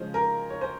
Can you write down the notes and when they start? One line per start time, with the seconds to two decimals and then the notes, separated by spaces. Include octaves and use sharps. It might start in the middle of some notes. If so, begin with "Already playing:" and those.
Already playing: C#3 F3 G#3 C5
0.14 A#4
0.50 C#5
0.61 C5